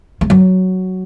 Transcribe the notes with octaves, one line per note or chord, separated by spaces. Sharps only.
G#3
F#3